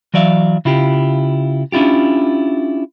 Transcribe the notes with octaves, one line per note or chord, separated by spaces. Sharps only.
E3 F#3 D5 E5 F5
C#3 E4 F4 G4
C#4 D4 E4 F4 G4